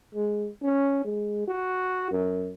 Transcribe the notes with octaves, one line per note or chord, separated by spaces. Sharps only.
G#3
C#4
G#3
F#4
F#2